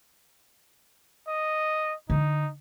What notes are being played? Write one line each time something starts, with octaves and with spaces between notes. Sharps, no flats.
D#5
D3 D#4